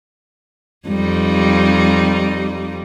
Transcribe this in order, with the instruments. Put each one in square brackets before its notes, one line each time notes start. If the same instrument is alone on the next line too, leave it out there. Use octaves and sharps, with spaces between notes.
[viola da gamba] F2 G3 D#4